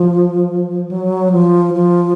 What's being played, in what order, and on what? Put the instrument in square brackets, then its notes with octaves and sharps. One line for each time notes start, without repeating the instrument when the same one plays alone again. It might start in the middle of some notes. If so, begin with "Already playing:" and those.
Already playing: [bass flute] F3
F#3
F3
F3